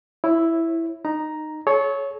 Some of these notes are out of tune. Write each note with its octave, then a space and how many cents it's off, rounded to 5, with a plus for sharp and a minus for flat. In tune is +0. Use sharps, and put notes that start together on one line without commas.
E4 +0 C#5 -25
D#4 -15 A#5 +5
A4 -40 C#5 +0